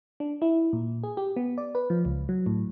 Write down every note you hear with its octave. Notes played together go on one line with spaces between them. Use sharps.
D4
E4
A#2
G#4
G4
B3
D5
B4
F3
C#2
F#3
A2